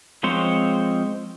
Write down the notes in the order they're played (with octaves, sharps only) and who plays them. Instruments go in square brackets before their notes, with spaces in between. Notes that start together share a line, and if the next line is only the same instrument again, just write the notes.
[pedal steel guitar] F3 G#3 C4 C5 C#5